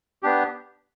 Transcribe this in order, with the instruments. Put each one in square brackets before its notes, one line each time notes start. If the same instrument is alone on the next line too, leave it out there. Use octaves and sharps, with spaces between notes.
[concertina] B3 D4 G4